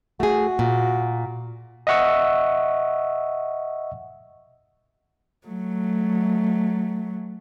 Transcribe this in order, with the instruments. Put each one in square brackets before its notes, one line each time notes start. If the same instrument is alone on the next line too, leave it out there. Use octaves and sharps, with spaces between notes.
[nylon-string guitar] A3 G#4 [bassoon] F#4
[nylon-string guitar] A#2
[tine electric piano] D#5 E5 F#5 C#6 E6
[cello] F#3 A3